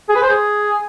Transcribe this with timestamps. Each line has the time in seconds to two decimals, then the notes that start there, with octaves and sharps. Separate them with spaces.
0.09 G#4
0.16 B4
0.23 C5
0.30 G#4